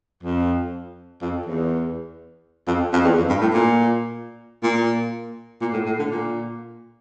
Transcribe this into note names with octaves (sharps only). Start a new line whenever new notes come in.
F2
F2
E2
F2
F2
E2
F2
G2
A2
A#2
A#2
A#2
A2
A2
D3
A#2